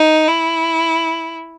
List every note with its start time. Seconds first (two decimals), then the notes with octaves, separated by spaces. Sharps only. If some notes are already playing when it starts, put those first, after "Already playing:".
Already playing: D#4
0.28 E4